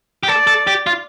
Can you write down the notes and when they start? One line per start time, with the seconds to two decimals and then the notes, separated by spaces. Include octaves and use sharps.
0.23 G4
0.28 A4 D5
0.47 A4
0.67 G4
0.87 F4